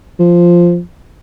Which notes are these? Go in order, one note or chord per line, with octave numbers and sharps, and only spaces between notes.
F3